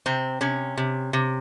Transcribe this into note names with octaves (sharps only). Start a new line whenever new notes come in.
C3 C4
C3 C#4
C3
C3